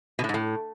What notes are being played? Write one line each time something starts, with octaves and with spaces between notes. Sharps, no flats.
B2
A2
G#2
A2